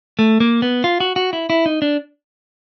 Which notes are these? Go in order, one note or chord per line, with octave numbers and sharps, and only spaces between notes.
A3
A#3
B3
F4
F#4
F#4
E4
E4
D#4
D4